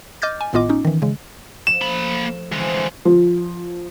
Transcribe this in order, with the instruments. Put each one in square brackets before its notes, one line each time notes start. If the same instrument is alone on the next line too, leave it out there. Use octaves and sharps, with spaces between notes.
[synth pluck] D#5 D6 F6 G6 A6
G#5
G#1 A2 B3 F4 D#5 D6
C#4 D#4
D#3 E3
C#3 G#3
[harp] F3 [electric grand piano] E7
[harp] A3 [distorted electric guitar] A#3 B5
[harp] D3 F3 C4 [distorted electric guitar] E3 G#3
[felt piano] F3